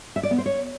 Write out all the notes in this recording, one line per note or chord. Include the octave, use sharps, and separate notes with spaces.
E5
D5
B3
C5
C#5